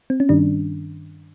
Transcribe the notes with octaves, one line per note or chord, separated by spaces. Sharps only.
C4
C#4
G2 D#3 G3 D4